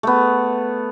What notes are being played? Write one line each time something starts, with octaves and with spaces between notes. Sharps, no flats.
A3 B3